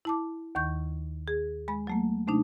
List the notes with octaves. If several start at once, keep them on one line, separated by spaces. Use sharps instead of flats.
E4 A5 D6
D#2 D#3 C#6 G6
G#4
G#3 B5
F#3 A3 A#3
C3 A3 D4 D#4